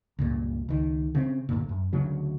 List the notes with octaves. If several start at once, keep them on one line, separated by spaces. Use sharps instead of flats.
C#2 G2 A#2
C#2 D#3
C#3 A3 C4
D2 G2 A#2
F#2
D2 C#3 F#3